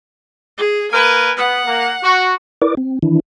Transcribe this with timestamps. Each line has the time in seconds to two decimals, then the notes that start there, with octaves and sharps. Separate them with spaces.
0.58 G#4
0.92 A#3 A#4 B4 G#5
1.37 B3 F#5
1.66 A#3
2.03 F#4
2.62 E4 A#4 B4 D5 D6
2.77 C4
3.03 D#3 E3 D4 E4